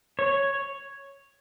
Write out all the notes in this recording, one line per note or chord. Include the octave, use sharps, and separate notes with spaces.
C#5